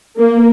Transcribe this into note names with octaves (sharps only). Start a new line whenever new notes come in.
A#3